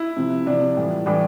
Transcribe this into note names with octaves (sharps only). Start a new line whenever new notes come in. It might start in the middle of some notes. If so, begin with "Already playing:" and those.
Already playing: E4
C3 F3
C3 F3 D4
A2 E3 G3
A2 E3 G3 D4